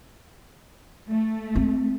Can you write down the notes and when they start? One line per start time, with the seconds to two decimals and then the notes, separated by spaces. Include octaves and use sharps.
1.10 A3
1.56 C4